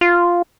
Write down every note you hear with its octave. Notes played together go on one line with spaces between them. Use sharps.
F4